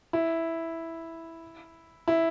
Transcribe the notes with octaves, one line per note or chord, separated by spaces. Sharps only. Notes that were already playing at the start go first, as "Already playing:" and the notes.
E4
E4